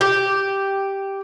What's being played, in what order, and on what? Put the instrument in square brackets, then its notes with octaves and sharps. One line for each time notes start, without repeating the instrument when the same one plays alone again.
[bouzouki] G4